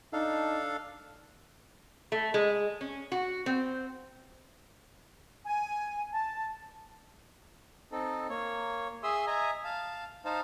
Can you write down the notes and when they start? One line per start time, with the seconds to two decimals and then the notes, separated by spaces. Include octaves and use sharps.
0.13 D4 D#4 A4 F5
2.12 A3
2.34 G#3
2.81 C#4
3.12 F#4
3.46 C4
5.45 G#5
6.13 A5
7.92 C4 D#4 A4
8.29 A#3 C#5
9.03 G#4 E5 C6 D#6 E6
9.27 D#5 E5 G#5 A#5
9.64 F5 A5
10.25 D#4 C5 F5 A5